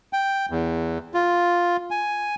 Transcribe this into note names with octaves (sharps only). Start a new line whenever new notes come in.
G5
E2
F4
G#5